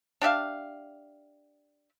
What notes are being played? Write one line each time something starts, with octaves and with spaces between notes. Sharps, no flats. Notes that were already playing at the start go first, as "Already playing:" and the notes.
D4 G4 E5 F5